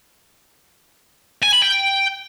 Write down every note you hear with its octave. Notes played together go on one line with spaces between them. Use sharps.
G#5
B5
G5